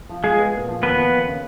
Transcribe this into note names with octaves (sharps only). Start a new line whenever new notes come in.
F3
G#3 F4 G#4
B3
A#2
F3
D#2 B3 B4
F3
D#2
C#3